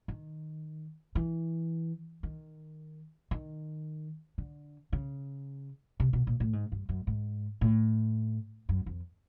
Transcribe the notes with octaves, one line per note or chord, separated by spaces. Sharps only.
D#3
E3
D#3
D#3
D3
C#3
C3
B2
A#2
A2
G#2
G2
F#2
G#2
A2
F#2
F2